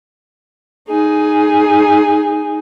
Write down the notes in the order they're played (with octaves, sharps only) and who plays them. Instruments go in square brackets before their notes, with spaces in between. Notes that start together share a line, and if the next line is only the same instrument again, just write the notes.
[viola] D#4 G#4